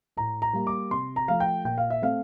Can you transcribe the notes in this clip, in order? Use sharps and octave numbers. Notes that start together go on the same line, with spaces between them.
A2 A#5
A#5
G3 A#3
D6
C3 C6
A#5
F3 A3 F5
G5
A#2 G5
F5
E5
A3 C4 F5